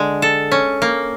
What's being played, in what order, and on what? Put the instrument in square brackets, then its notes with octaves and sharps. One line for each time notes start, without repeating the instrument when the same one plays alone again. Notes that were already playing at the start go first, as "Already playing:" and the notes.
Already playing: [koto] D3 G#3
A4
C#4
A#3